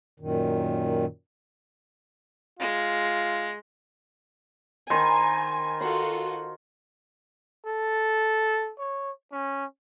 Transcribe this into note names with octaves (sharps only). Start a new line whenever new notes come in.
F#2 A#2 D#3
G#3 F4
D#3 C5 G#5 B5
F4 F#4 A4 C6
A4
C#5
C#4